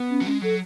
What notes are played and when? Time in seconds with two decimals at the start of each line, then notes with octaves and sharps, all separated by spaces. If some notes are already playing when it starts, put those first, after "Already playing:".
Already playing: B3
0.10 C#4
0.21 F#3
0.26 G#3 C#4
0.42 F#3 A4